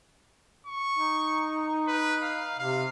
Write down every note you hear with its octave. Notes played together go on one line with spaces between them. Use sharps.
C#6
D#4
B4
F5
C3 F5